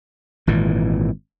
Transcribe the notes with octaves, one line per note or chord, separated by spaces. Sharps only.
G#1 A#2 E3